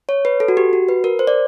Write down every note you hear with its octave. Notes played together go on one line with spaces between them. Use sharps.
C#5
B4
A4
F#4
G4
F#4
B4
A#4
C5
D5